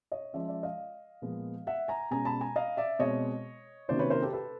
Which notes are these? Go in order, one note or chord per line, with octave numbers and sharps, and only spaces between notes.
C#5 D#5
F3 G#3 C#4 D5 E5
D5 E5
D#5 F5
A#2 F3 G#3 B3
E5 F#5
G#5 A#5
B2 G#3 C#4 G#5 A#5
A5 B5
G#5 A#5
D#5 F5
D5 E5
B2 G#3 C4 C#5 D#5
C3 D#3 F#3 A#3 C#4 C5 D5
B4 C#5
A#4 C5
G4 A4
A4 B4